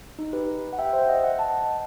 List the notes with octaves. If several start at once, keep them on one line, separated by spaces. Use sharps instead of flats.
D#4
G4 B4
F#5
E5 G5
C5 E5
D#5 F#5
D#5 F#5
F#5 A5